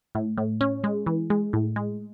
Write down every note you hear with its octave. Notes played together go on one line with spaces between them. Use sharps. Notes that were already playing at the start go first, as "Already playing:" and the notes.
A2
A2
C#4
G#3
E3
G#3
A2
G#3